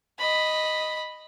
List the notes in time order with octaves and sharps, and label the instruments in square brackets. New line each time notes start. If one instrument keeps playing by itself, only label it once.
[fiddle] D#5 B5